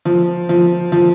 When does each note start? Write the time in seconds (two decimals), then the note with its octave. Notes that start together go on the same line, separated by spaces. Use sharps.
0.05 F3
0.49 F3
0.92 F3